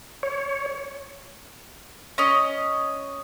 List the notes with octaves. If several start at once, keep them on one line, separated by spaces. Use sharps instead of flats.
C#5
C#4 D#5